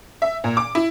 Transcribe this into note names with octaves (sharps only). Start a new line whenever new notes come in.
E5
A#2
D6
E4